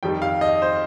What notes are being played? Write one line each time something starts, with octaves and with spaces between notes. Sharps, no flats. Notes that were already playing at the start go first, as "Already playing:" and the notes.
F2 D#3 G3 G5
F5
D#5
C5